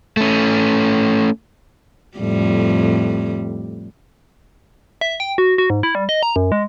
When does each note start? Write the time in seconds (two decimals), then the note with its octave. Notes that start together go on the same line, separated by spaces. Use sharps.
0.17 A3 C#4
2.18 F2 A2 G3
5.01 E5
5.20 G5
5.38 F#4
5.58 F#4
5.70 G#2
5.83 E4
5.95 G3
6.09 D#5
6.23 A#5
6.36 F#2
6.52 G#3